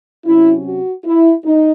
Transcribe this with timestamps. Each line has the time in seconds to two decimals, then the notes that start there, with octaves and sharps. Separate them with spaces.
0.25 C3 F#3 C#4 E4
0.65 F#4
1.05 E4
1.44 D#4